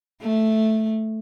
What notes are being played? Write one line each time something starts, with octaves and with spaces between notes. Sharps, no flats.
A3